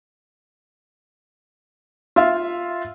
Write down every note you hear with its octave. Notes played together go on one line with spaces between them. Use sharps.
F4 E5 F5